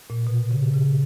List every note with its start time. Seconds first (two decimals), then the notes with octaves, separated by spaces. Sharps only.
0.10 A#2
0.27 B2
0.51 C#3
0.74 C#3